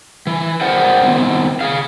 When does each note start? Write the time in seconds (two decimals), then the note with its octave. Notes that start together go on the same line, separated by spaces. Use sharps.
0.27 E3
0.61 G#4 A#4 C5 D5 F#5 G5
1.03 D#3 E3 B3 C4
1.61 G#4 F5